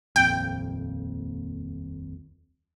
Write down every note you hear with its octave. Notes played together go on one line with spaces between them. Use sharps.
D#1 A#1 F2 G5